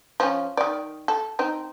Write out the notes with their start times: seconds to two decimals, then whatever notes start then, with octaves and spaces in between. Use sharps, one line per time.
0.20 F3 C#4
0.57 D#3 D5
1.08 A4
1.39 C4 D#4